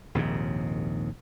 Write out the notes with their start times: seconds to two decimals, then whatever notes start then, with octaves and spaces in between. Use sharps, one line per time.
0.15 A#1 D#2 G#2 C3